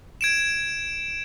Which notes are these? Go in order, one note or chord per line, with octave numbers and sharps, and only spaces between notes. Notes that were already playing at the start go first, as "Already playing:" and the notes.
G#6 D7 E7